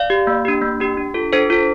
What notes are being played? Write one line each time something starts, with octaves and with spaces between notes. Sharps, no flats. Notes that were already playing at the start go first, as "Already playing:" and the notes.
Already playing: D5 F5
G4
A#3
D4 G4
A#3
D4 G4
D4
F4 A4
D4 A4 C5
F4 A4